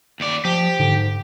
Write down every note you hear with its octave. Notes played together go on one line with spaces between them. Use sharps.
D#2 D5
F3 G4
G#2 D3